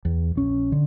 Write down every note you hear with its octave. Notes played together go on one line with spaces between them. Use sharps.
E2
A#1 C#4
D3